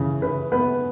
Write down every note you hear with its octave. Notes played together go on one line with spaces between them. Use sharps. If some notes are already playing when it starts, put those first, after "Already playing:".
Already playing: C#3 E3
C#3 B4
B3 B4